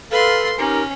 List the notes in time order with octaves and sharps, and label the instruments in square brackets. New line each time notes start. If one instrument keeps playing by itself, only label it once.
[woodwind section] A4 F5 [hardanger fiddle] B4 C6
[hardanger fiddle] C#4 [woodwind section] D#4 G4 A#4